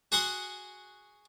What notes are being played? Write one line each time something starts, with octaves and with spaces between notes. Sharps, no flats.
F#4 G#4 F#5 G#5 C6 D#6